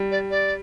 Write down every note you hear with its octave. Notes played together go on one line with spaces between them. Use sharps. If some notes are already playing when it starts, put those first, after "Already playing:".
Already playing: G3
D5
D5